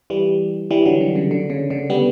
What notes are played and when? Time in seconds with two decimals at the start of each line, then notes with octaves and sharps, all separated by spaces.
0.10 E3 G3
0.71 E3 G3
0.86 D3 F#3
1.01 D3
1.16 C#3
1.31 D3
1.50 C#3
1.70 D3
1.90 G3 B3